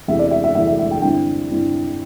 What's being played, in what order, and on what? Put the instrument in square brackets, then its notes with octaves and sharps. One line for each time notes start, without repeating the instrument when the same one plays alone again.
[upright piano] E2 C3 A3 E4 E5
D5
E5
E5
E2 C3 A3 E4 E5
E5
E5
G5
G2 D3 C4 E4 G5
G2 D3 C4 E4